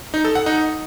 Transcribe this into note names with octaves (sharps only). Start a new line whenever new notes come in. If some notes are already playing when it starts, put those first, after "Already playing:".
D#4
A4
F#5
D#4